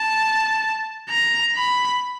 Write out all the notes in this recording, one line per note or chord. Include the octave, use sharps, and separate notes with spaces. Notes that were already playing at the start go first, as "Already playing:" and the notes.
Already playing: A5
A#5
B5